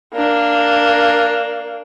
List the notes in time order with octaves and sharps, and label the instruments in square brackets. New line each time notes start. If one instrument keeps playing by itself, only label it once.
[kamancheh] A#3 D4